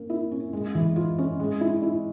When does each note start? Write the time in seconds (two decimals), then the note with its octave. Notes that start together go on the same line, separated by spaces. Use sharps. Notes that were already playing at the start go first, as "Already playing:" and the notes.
Already playing: A#3 C#4
0.10 E4
0.31 C#4
0.53 G#3
0.75 E3
0.96 F4
1.18 C#4
1.40 G#3
1.61 E4
1.82 E4